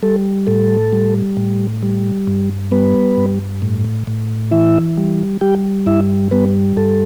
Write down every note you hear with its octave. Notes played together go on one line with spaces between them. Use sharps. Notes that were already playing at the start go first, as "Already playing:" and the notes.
G3 A4
A2 A4
G3
A2
G3
G2
G3 B3 B4
G2
A2
A2
E3 E4 E5
G3
G3 G4 G5
G2 E4 E5
G3 B3 B4
G2 A4